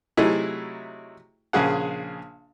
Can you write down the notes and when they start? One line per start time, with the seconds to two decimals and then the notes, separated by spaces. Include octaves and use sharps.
0.17 C3 F#3 A3 D#4 E4 G#4
1.53 A#1 C#3 G#4 F#5